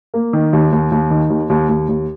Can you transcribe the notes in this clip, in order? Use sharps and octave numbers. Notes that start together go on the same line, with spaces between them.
A#3
D#3
D#2
D#2
D#2
D#3
D#2
D#2
D#2
D#2